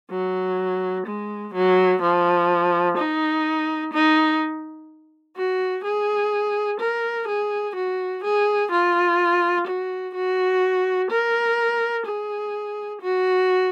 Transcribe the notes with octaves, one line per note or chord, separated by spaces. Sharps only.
F#3
G#3
F#3
F3
D#4
D#4
F#4
G#4
A#4
G#4
F#4
G#4
F4
F#4
F#4
A#4
G#4
F#4